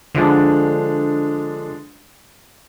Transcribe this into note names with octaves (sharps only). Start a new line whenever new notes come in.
D3 F3 G#3 D4